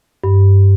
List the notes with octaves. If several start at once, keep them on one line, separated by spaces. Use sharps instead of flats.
G2